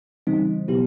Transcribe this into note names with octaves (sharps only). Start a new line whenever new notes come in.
C#3 E3 G3 C4 D#4
B2 F#3 B3 E4 G4